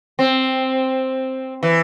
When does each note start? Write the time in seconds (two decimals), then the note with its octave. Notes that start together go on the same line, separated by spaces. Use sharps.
0.19 C4
1.63 E3